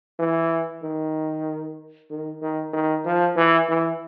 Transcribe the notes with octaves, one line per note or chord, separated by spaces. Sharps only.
E3
D#3
D#3
D#3
D#3
F3
E3
E3